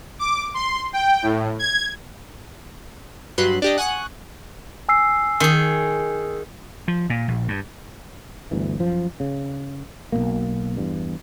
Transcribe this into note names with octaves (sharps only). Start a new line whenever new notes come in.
D6
C6
G5
A2
G#6
G2 F#3 B4 B5 C6 F#6
D4 G4 D#5
F#5 G#5 C#6 D#6 F#6
G#5 E6 C7
D#3 G#4
F3
A#2
A#1
G2
G1 D2 E3
F#2 F3
C#3
B1 F2 B2 A#3
E2 G2